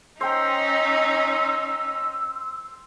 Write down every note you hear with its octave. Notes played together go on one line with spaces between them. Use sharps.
C#4 D#4 C5 G5 A#5 E6